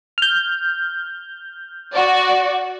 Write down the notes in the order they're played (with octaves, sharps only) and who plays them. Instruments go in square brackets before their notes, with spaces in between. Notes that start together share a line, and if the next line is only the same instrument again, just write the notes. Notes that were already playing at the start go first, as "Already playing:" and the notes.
[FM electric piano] F6 G6
[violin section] F#4 D5